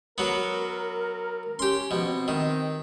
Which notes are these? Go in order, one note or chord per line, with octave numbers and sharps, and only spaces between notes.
F#3 B3 A#4
C#4 G4 C6
B2 F3
C4
D#3